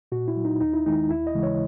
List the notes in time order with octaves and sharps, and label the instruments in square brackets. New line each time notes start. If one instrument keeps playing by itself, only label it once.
[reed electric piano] A#2 F#4
E4
F#3
D#4
D#2 D#4
E4
D#3 G#3 D#4
D#2 E4
D#5
C#3 E3 G#3
C#5